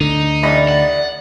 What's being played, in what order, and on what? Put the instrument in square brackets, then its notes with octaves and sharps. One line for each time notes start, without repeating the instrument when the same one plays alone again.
[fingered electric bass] D2 D3 [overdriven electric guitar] D#4
[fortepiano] A1 D#5 B5 [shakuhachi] D5
[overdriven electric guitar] F#5